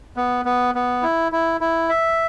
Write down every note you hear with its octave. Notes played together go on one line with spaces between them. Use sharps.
B3
B3
B3
E4
E4
E4
E5